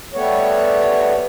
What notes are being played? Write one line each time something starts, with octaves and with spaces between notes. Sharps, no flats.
G3 A3 B3 C#5